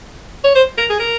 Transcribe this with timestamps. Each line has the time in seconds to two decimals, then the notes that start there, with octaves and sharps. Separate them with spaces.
0.44 C#5
0.55 C5
0.78 A#4
0.90 G#4
0.99 A#4